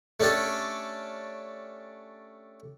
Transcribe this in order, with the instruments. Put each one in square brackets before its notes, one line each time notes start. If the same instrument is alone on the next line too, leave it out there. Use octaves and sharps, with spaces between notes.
[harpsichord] A3 C#4 D4 G4 A4